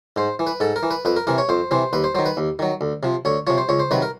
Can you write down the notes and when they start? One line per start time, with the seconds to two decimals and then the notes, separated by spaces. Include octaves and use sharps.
0.16 G#2 C5
0.39 E3
0.47 B4
0.60 G#2 A4
0.76 A#4
0.83 E3
0.91 B4
1.05 F2 B4
1.16 A#4
1.27 C3 E3 A#4
1.38 C#5
1.49 F2 C5
1.71 C3 E3 C5
1.93 D#2 B4
2.04 C5
2.15 D#3 F#3 C5
2.26 B4
2.37 D#2
2.59 D#3 F#3
2.81 D2
3.03 C3 F3
3.25 D2 C#5
3.47 C3 F3 C#5
3.58 C5
3.69 C#2 C#5
3.80 C5
3.91 C3 D#3 F#3 B4
4.02 A#4